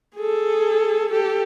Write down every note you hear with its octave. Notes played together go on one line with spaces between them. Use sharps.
G#4 A4
G4 A4